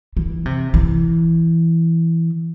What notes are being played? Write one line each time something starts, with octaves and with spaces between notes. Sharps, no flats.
E3
C3
E3